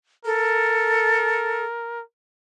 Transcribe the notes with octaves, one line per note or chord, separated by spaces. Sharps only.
A4 A#4